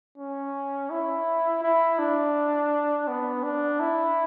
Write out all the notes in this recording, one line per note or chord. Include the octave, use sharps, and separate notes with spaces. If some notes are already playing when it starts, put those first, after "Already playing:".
C#4
E4
E4
D4
B3
D4
E4